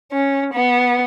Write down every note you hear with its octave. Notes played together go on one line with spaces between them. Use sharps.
C#4
B3